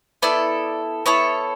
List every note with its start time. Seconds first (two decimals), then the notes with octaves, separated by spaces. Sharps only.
0.22 B3 E4 A4 D5
1.06 B3 E4 A4 C#5